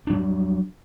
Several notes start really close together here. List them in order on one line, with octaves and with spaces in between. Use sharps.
D4 F#3 G3